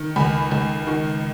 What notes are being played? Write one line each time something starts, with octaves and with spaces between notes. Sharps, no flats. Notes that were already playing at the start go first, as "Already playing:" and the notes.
Already playing: D#3
C#2 G#5 B5
C#2
D#3